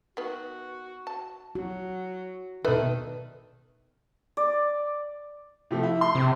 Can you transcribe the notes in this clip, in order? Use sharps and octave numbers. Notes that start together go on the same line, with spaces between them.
D#3 B3 F#4
A5
F#3 F#4
B2 D#3 A4 B4 D5 E5
D5
C3 F3 A3
E4
C6
C3